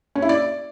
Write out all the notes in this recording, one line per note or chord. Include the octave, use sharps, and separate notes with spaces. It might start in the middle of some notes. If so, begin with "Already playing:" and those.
C#4
E4
D5